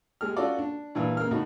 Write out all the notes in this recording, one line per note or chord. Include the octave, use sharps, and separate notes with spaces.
G#3 G4 F6
C#4 F4 F#4 A4 D5
D4
G2 A#2 E3
C#3 A#3 A#4 F6
A2 D#4 F#4